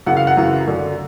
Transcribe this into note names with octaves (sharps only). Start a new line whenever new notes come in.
F#2 C#3 E3 F#5
F5
F#5
F#2 C#3 E3
F#2 D3